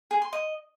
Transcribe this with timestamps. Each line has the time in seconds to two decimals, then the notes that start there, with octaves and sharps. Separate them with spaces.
0.11 G#4
0.22 C6
0.33 D#5